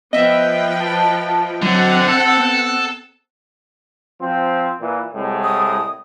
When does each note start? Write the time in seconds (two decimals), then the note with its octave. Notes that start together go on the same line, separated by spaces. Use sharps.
0.13 F3 B3 B4 D#5 E5 G5
0.80 A5
1.62 D3 F#3 C4 F#5
2.09 A4 E6
2.38 B3
4.21 F3 C4
4.80 A#2 E3
5.13 C2 A2 G#3
5.44 D#6